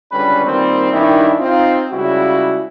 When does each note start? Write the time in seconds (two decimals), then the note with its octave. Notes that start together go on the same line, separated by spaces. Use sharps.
0.11 C#2 D3 G3 C#4 B4
0.45 A#2 D#3 G3 C4
0.92 G2 D#3 C#4 D4 E4 G4
1.40 C4 D#4 F4
1.91 C#2 C#3 G3 E4 F#4